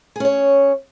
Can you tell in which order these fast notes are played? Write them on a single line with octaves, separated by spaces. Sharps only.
G#4 C#4 C#5